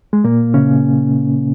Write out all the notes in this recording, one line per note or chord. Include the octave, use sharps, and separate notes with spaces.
G#3
A#2 A#3
C#3 C#4